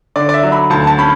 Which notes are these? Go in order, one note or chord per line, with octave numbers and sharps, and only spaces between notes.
D3 D5
D5
E5
F#3
B5
D2 A5
A5
C#4 B5